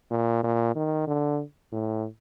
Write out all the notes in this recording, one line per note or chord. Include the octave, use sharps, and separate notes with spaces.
A#2
A#2
D#3
D3
A2